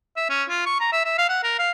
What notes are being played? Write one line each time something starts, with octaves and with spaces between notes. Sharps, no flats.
E5
C#4
F4
C#6
A#5
E5
E5
F5
F#5
A#4
F5